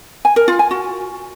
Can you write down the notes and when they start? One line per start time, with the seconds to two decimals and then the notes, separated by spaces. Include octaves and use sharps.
0.25 G#5
0.36 A#4
0.48 F4
0.59 G#5
0.71 F#4